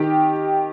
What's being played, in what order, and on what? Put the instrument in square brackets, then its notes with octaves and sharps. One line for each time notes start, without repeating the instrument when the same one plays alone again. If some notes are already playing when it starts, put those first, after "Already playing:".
Already playing: [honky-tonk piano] D#3 G4